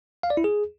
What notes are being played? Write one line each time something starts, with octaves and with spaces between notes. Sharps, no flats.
F5
D5
E4
G#4